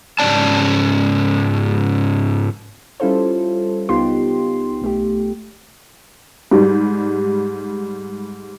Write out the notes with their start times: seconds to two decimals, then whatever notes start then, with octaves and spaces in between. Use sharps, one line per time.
0.19 G#2 C#3 C#4 D5 A5
3.00 G3 C#4 E4 F4 A4 C5
3.89 C#2 B3 D#4 F4 G4 C6
4.82 B1 A3 G4
6.51 G#2 G3